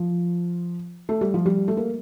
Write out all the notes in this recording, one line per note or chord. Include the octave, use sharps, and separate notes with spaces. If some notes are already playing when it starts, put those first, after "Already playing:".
Already playing: F3
A3
G3
F3
G3
A3
A#3